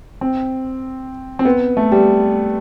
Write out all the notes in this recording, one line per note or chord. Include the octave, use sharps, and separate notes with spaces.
C4
C4
B3
A3
G3